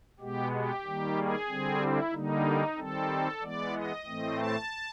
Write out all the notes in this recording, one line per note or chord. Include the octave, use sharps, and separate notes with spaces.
B2 G#3 B3 G4
G4
D#3 G3 A#3
G#4
D3 G3 C4
E4
D3 G3 A#3 D#4
D#3 G3 C4 A4
E3 G#3 B3 D5
D#5
A2 E3 A3 C4
A5